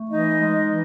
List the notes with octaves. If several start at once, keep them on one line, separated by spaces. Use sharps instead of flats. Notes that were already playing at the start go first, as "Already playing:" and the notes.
Already playing: A3
E3 D#4 D#5
G#3
E3